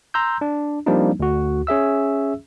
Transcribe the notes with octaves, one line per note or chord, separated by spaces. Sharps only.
A#5 C6 E6 G6
D4
F3 G3 A#3 C4 D4 D#4
D2 F#4
C#4 G#4 E5 E6